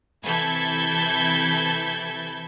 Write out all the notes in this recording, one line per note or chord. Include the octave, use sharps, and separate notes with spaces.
C3 E3 A4 B5 G6 G#6